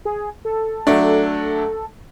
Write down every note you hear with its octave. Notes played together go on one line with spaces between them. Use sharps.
G#4
A4
F#3 A3 D4